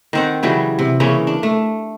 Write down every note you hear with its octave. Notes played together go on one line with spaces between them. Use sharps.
D#3 C4 F#5
C#3 E3 F#3 G3
C3
C#3 E3 A#3 C#4
D4
A3